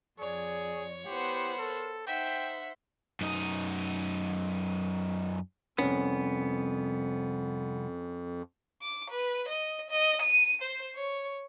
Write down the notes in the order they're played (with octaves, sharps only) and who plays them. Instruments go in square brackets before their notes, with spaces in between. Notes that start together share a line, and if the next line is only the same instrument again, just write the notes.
[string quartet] F2 [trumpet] G#4 [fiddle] C#5 [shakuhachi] D5
[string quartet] B3 C5 F#5 [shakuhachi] E4 [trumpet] G4
[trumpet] A4 [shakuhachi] A#4
[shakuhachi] D#4 [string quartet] C5 [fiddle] E5 F#5 [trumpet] G5
[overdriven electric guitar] F#2 D#4
[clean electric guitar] C2 B3 [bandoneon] F2 [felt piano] C#4
[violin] D6
B4
D#5
D#5
D#7
C5
C#5